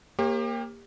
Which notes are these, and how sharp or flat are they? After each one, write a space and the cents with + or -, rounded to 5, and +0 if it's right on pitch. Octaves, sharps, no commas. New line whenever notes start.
A#3 +0 G4 +30 C#5 -40